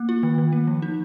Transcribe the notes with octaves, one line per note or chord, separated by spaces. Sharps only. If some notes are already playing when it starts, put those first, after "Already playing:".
Already playing: A#3
F4
D#3
D#3
A#3
F3
D#4